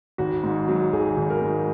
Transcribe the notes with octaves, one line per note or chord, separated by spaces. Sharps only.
G#1 F#4
G#2
F#3
G#1 G#4
G#1
A#4
G#2